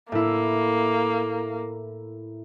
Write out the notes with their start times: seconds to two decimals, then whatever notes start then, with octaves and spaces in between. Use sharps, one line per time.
0.12 A2 A#3 E4